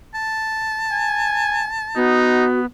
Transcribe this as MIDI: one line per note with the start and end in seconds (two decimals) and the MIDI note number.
0.14 2.12 81
0.92 1.68 80
1.96 2.65 59
1.96 2.45 63
1.96 2.60 66